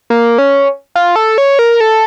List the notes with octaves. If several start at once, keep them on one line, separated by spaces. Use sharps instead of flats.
A#3
C#4
F4
A4
C#5
A#4
A4